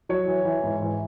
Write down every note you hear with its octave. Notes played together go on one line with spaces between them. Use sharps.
F#3 C#5
E3
E3
G#2
E3